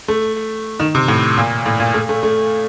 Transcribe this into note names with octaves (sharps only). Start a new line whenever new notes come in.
A3
D#3
C3
A2
A#2
A2
A#2
A3
A3
A3